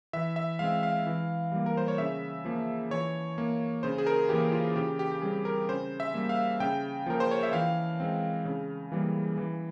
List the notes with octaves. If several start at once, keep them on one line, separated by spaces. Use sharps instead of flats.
E3 E5
E5
G#3 C4 F5
F5
E3
G3 A#3
A#4
C5
C#5
C#3 E5
F3 A#3
E3 C#5
A#3
C#3 C5
G#4
A#4
E3 A#3 G4
F4
C#3 G4
G4
G4
G3 C4 G#4
A#4
C#3 C5
E5
G3 A#3
F5
C#3 G5
F3 A#3 A#4
C5
C#5
E5
E3 F5
G#3 C4
C#3
E3 G3 A#3
E3